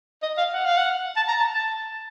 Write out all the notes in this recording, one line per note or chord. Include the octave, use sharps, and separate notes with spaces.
D#5
F5
F#5
F5
F#5
A5
A#5
A5
A5